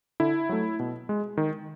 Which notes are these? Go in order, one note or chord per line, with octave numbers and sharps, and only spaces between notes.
D3 E4
F#3 A3
B2
G#3
D#3